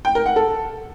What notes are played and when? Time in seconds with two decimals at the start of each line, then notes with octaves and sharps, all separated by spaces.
0.05 G5
0.15 A#4
0.26 F#5
0.36 A4